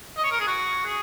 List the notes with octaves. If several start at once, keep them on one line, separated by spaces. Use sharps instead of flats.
D#5
C#5
A#4
G#4
F#4
G#4